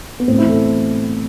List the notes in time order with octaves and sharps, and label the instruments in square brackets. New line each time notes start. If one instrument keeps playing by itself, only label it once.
[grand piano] B3
A2 C4
E4
E3
A4